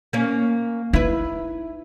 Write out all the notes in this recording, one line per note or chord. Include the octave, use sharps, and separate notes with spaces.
A#3 C#4
D#4 E4 B4